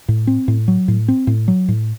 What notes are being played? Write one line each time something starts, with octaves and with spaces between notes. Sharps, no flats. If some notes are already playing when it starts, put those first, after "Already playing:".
A2
C4
A2
F#3
A2
C4
A2
F#3
A2